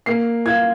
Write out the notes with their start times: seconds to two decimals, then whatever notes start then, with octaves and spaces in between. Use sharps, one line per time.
0.06 A#3 C7
0.45 F4 G#6